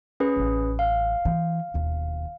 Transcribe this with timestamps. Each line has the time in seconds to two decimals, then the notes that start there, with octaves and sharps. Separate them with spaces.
0.20 C#4 G#4 B4
0.36 A1 F#3
0.79 F5
1.25 E3
1.74 E1 D#2